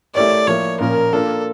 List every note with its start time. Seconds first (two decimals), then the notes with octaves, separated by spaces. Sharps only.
0.15 A3 E4 G4 A#4 C#5 D5
0.48 F3 A#3 E4 C#5
0.80 A#2 F3 A#3 C#4 A#4
1.13 A#3 D4 F4 A4